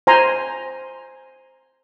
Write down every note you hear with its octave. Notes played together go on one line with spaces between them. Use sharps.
C5 G#5 A#5 C6